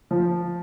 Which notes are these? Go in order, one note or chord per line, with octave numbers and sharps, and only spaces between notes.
F3